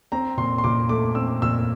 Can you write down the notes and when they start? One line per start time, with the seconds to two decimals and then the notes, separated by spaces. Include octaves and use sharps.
0.12 C4 A#5
0.37 A#2 C6
0.58 C6
0.64 A#2 D6
0.89 A3 D6
1.15 C4 E6
1.42 A#2 E6